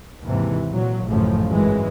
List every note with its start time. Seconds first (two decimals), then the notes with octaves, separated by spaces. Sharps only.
0.24 D#2 G#2 C3 E3
0.69 A#2 F#3
1.06 A1 F#2 A2 C#3 F3
1.49 G#1 F#2 E3 G#3